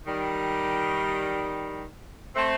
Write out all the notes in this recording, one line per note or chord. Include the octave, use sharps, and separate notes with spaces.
D#3 G3
A3 C4